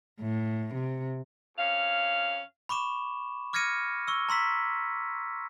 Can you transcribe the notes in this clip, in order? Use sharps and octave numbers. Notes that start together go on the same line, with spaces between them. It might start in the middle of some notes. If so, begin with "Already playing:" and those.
A2
C3
F2 C#4 F5
B5 C#6 D6 E7
D6 F6 G#6 A#6 C#7 D#7
C#6 E6
A#5 C6 E6 B6